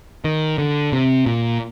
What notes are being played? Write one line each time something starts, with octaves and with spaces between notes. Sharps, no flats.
D#3
D3
C3
A#2